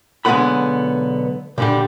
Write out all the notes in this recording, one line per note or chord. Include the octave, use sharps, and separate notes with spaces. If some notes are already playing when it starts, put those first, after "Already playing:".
B1 D3 G#3 B3 F#5 B5
A#2 D3 G3